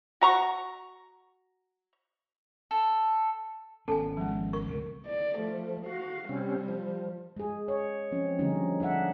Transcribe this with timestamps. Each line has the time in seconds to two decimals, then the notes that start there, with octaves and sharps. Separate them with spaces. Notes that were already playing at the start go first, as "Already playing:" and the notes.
0.21 F#4 A#5 C#6
2.71 A4
3.88 G#1 B3 C#4 A4 G#5 A5
4.17 F3 G#3
4.53 A#4 C#6
4.68 C#2 C3
5.06 D5
5.38 F3 A3
5.86 F#4 F5
6.29 C3 G3 C4 C#4
6.68 F3
7.37 G#3 G#4
7.68 C#5
8.12 F3 C4 C#4
8.39 D3 F3 G3 A3 C#4 D#4
8.80 D4 D#4 E5 F#5